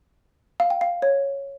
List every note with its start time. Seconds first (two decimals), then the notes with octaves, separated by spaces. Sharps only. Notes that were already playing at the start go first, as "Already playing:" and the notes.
0.60 F5
0.70 G5
0.81 F5
1.02 C#5